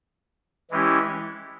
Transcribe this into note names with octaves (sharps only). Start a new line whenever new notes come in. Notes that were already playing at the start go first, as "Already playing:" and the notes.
E3 G#3 C#4 E4 G4